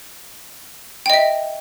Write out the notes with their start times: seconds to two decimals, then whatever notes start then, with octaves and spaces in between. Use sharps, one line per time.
1.06 G5
1.10 D#5
1.14 E5